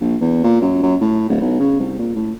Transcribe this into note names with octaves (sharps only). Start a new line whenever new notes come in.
A#1
E2
A#2
F#2
F#2
A2
D1
B1
C#3
C2
A#2
A2